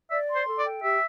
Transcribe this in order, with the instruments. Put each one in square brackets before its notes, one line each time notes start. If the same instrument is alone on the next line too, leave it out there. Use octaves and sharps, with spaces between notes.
[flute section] D5 [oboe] E5
[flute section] C6
[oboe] C5
[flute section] A4
[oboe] D5
[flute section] G5
[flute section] G4 [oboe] E5